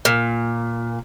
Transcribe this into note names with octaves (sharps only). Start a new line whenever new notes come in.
A#2